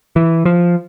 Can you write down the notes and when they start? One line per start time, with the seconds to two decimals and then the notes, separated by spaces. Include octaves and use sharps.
0.16 E3
0.45 F3